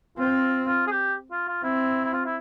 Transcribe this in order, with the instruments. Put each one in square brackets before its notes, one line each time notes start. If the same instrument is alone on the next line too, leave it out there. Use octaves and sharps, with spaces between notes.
[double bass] C4 [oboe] F4
[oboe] F4
G#4
G4
F4
F4
[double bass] C4 [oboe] E4
[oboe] E4
F4
E4